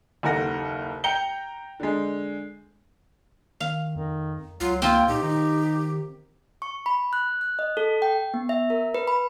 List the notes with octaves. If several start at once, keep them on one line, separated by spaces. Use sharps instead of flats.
F#1 D#2 A4 A#4 F#5 A#6
G5 A#5 G6 C#7 G7
D3 G#3
D#3 F5
F2 D#3
C#2 F#3 F4
A#3 C4 F4 G5
A#2 D#4 G4
D#3 D#4
C#6
B5
F#6
F#6
D#5
A4
G5
B3
E5
A#4
B4
B5